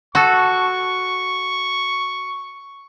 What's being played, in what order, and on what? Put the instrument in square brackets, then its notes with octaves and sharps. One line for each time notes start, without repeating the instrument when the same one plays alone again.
[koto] F#4 A4 [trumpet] C#6